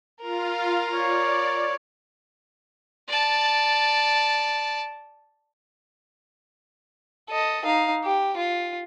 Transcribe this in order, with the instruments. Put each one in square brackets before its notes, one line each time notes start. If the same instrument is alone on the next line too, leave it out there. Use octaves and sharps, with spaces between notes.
[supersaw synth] F4 F5 [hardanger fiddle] A#4
[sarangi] C#5 [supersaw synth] D5
[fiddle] D5 A5
[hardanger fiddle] A4 D#5
D#4 F5
G4
F4